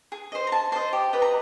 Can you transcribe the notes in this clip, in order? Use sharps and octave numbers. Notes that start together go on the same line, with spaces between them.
G#4
C5 D#5
A#5
G#4 A5
C5 D#5 A5
G4
B4 D#5
A#5